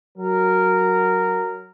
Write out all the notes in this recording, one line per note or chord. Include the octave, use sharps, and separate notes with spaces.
F#3 A#4